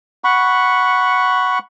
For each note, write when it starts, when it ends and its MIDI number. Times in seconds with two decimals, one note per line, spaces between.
0.24 1.59 78
0.24 1.59 83
0.24 1.59 85